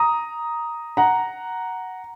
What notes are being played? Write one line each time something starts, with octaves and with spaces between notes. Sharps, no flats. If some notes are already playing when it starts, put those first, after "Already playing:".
Already playing: A#5 D#6
F#5 A#5